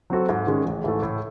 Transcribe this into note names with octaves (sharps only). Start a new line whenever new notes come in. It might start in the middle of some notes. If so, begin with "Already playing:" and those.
F#3 C4 F#4 A4
G#2
D#3 G#3 C#4
A1
G#2 E3 A3
A2